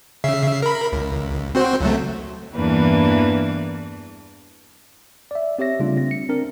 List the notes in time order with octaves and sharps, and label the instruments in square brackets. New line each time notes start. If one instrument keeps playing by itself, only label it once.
[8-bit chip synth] C#3 E5 C7
A#4 B5
C#2
C4 F#4 C5
C#2 F#3 A3
[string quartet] E2 G2 E3 A#3 D4 B4
[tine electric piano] D5 E5
C4 G4 C#5 E5 A#6
C#3 G3 A3 D4 F4
C4 A#6
C#7
C4 D4 A#4